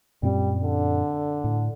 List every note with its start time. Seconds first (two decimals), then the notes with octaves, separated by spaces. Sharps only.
0.23 F#2 A#2 G3 C4
0.63 D3
1.44 A2